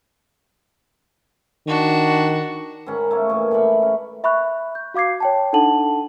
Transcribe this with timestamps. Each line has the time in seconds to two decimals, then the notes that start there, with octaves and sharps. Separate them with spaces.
1.67 D#3 D4 F#4
2.86 G#2 D#3 C#4 B5
3.11 A3 A#3 C#5
3.30 A#2 E3
3.51 A2 D5 B5 C#6
3.82 C#4
4.24 E5 B5 C#6 F#6
4.75 G6
4.94 F#4 F5 D6 G#6 C7
5.20 C#5 G5 A5
5.53 D4 D#4 A4 F#5 A5 F#7